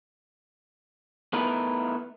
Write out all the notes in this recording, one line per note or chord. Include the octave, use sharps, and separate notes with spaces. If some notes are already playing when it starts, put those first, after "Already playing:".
A3 B3 D#4 E4 A#4 B4